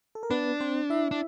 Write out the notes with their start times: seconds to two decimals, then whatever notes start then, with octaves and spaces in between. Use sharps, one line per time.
0.15 A4
0.23 A#4
0.31 B3 D4 B4
0.60 C4 C5
0.90 E4 E5
1.11 D4